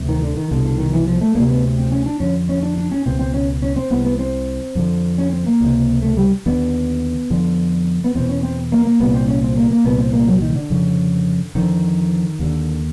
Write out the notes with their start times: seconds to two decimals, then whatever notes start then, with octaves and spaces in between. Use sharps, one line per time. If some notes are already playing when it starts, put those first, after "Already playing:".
Already playing: D2 C3
0.09 D#3
0.22 D3
0.37 D#3
0.51 C2 B2 D3
0.65 D3
0.78 D#3
0.93 E3
1.07 F3
1.21 A3
1.35 D2 C3 A#3
1.50 B3
1.79 C4
1.92 C#4
2.06 D4
2.20 F2 D3 C#4
2.49 C#4
2.63 D4
2.78 D4
2.92 C#4
3.06 C#2 B2 C4
3.19 C4
3.34 C#4
3.62 C#4
3.76 C4
3.90 C2 C3 B3
4.05 B3
4.19 C4
4.75 F2 D3
5.18 C#4
5.32 C4
5.46 A#3
5.61 C#2 C3
6.02 A3
6.17 G3
6.46 D#2 D3 B3
7.30 F2 D3
8.04 B3
8.15 E2 B2 C4
8.29 C#4
8.43 C4
8.72 A#3
8.85 A#3
9.00 C2 A#2 B3
9.14 C4
9.28 C#4
9.43 C4
9.57 A#3
9.71 A#3
9.84 C2 A#2 B3
9.98 C4
10.13 A#3
10.28 F#3
10.41 D#3
10.56 D3
10.70 F2 C#3
11.55 F2 D3 D#3
12.39 D#2 D3